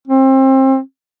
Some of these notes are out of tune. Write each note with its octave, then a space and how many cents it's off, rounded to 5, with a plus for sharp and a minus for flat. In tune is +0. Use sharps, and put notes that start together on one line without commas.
C4 +30